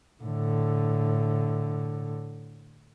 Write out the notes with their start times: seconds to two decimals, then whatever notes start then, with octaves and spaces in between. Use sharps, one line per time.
0.23 A2 D3